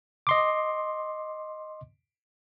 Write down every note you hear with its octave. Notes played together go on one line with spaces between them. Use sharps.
D#5 C6 D6